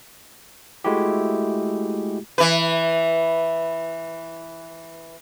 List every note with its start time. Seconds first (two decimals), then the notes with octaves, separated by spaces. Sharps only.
0.84 G#3 A3 E4 F#4 G4
2.38 E3 B4